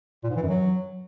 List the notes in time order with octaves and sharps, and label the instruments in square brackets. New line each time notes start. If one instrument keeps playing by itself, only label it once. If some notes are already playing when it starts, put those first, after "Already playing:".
[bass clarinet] A#2
G#2
E3
F#2
F#3